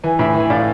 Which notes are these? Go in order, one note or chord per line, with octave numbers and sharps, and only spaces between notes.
E3 G#5
A2 E5 G#5
E3
G#5
A2 D5 F5